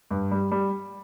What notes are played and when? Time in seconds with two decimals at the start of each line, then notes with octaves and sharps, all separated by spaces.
0.11 G2
0.31 G3
0.52 G3